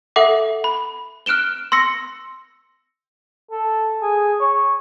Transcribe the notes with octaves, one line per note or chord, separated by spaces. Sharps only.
A4 E5 F#5 D6
B5
F6 F#6 D7 E7 G7
C6 E6 A#6 C#7
A4
G#4
C#5